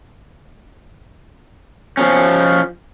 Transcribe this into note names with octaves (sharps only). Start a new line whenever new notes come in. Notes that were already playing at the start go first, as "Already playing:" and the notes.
F3 C#4